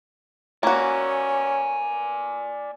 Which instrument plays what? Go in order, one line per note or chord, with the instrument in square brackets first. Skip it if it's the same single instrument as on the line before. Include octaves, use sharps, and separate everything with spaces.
[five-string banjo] A#3 F#4 [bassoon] C#4 [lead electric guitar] D5 G#5